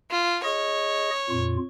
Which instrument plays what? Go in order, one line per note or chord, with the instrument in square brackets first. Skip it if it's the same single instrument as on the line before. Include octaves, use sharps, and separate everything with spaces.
[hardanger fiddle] F4
[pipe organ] G#4 D#5 [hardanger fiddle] C#5
[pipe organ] F2 A#2 F4